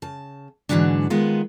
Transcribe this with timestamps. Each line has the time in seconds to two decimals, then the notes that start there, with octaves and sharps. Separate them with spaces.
0.02 C#3 A5
0.69 G#2 B2 D3 E3 F#3 D4
1.10 D#3 G#3 B3 F4